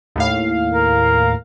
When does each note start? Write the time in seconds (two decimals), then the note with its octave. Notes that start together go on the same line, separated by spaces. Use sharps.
0.16 D#2 A2 F5
0.72 A#4